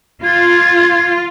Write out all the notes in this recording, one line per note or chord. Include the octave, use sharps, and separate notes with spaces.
F4 G#6